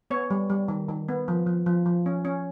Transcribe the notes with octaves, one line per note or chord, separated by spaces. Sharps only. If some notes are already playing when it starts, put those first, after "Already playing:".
B3 C#5
G3
G3
D#3
D#3
B3
F3
F3
F3
F3
C#4
C#4